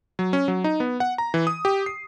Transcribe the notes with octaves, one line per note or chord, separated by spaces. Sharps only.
F#3
C#4
F#3
D#4
B3
F#5
A#5
E3
D#6
G4
C7